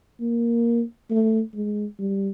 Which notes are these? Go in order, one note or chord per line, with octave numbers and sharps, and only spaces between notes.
A#3
A3
G#3
G3